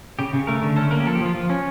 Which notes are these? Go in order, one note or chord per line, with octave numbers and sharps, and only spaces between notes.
C#3 G4
C#3
A3 A#4
D3
C#4 A4
A#3 A#4
G4
F3 A4
G4
F3 F4
F3
C#4